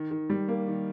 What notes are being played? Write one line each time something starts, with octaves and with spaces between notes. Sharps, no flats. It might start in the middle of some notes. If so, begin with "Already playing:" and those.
Already playing: D#3
D#3
G3
A#3
D#3